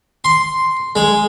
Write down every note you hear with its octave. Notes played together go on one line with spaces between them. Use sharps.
C6
G#3